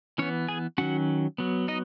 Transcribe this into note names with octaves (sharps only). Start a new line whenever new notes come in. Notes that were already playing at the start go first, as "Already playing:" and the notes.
E3 B3 C#4 C#5
G#4 G#5
D#3 F#3 C#4 F#4 F#5
F#3 B3
D#4 D#5